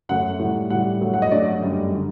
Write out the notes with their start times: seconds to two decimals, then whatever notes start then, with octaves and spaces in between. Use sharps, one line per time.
0.09 F#2 F#3 A3 F#5
0.39 A2 G3
0.70 A2 G3 F#5
1.01 G2 F#3 A3
1.14 F#5
1.22 D#5
1.32 G2 F#3 A3 D5
1.62 F#2 D3 G3
1.95 D3